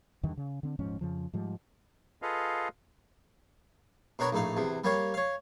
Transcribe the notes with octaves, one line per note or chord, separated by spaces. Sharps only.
E2 G2 D3 D#3
C#3
D3 C4
D#1 G#2 F3 C#4
F2 C#3 F3
G#2 F3 G3
F4 G#4 A4 B4 D#5 F5
B2 D4 A#4 C#5 B5
A#1 A2 D#4 F5
E2 C3
G3 A#3 C#5 F5
C#5 F5